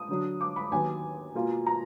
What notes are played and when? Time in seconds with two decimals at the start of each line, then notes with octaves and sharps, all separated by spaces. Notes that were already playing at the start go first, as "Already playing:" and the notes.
Already playing: D#6
0.09 D3 F#3 D4
0.41 D6
0.56 B5
0.71 D#2 D#3 F#3 B3 G#5
1.35 B2 A#3 F4
1.66 A#5